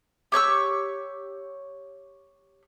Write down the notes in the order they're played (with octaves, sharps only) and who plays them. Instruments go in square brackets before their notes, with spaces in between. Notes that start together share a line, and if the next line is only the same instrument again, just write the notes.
[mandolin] G4 C#5 C#6 E6